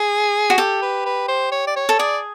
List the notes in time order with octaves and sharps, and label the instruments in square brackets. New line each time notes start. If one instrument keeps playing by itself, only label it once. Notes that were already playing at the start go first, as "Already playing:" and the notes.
Already playing: [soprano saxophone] G#4
[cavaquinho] F#4
[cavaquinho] G4 [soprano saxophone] A4
[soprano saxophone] B4
B4
C5
C#5
D5
C#5
[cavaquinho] A4
[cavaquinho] G#4 [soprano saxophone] D5